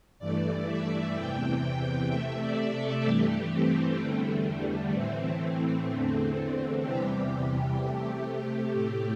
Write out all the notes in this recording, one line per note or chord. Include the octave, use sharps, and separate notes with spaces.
G2 E3 A3 D5
E5
E2 C3 E3 G5
G5
C3 A3 E5
D5
A4
G2 E3 A3 G4
C4
E2 D3 G3 A3
A2 E3 A3 C4
E2 D3 A3
E2 C3 E3 G3 G4
C3
A3
A2 A3 G4